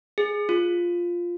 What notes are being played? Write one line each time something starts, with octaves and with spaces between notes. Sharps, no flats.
G#4
F4